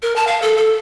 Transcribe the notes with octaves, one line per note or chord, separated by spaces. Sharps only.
A#4
A5
F5
A4
A4